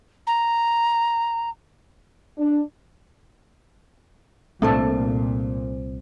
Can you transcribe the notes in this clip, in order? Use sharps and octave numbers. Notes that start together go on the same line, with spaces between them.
A#5
D4
C2 A#2 A3 C4 D4 A4 C5